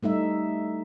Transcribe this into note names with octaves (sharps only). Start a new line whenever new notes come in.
G3 A3 D#4 E5